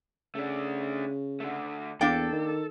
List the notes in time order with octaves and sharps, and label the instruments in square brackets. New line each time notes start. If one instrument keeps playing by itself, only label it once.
[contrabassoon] C#3 [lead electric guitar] A3 D4
[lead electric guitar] D3 A3
[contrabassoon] E2 [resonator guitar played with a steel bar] A#3 D4 G5 [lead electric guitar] A4
[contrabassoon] D#3